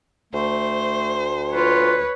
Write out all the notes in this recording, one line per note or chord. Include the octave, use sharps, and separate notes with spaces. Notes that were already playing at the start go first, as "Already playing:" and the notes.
D2 A3 C5
F4 B4 C#5